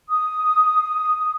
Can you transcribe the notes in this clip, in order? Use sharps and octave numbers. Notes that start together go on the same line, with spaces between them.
D#6